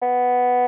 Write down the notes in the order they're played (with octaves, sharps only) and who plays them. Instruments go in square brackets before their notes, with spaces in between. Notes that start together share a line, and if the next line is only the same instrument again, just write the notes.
[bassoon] B3